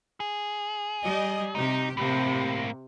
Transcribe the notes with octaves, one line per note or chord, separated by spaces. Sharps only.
G#4
G3 D#5
C3 D#4 G4
A2 C3 A#3